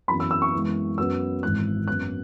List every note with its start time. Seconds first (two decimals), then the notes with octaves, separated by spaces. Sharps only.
0.08 F#2 E3 B3 B5
0.20 E6
0.31 E6
0.42 C#6
0.52 F#2 E3 G#3 B3
0.98 F#2 F#3 B3 E6
1.43 G#1 G#2 E3 F#6
1.87 F#2 F#3 B3 F#6